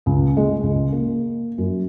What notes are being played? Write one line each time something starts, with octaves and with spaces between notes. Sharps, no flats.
C#2
G#3
C#2
A#3
F#2